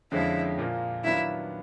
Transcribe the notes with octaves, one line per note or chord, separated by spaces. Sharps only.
F2 D3 F3 G#3 C#4 E4
A#2 F3 A#3
D#3 F#3 B3 D4 E4 F4